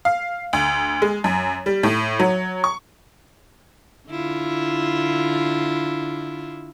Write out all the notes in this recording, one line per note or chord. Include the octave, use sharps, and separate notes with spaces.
F5
D2
G#3
F#2
G3
A2
F#3
C#6
D3 E4 F4